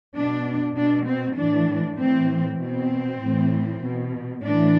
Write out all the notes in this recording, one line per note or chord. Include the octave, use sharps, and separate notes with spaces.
B2 D4
B2 D4
C4
A2 E3 D4
A2 E3 C4
B2 C4
A2 E3
B2
A2 E3 D4